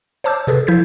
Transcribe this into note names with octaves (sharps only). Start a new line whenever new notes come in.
C5 C#5 A5 D6 E6 G6
C3 G#4 A4 B4
F3 E4 G6 G#6 B6